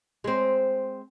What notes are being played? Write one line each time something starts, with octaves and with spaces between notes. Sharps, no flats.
G#3 C4